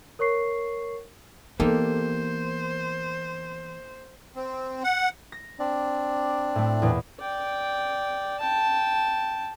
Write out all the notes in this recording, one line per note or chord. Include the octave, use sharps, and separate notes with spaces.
A#4 C#5 C#6 C7
E3 A#3 B3 D#4 G4 A4 C5
C4
F#5
A#6
C4 D4 D5
A2 A3
E2 A#2
D5 G5
G5 A5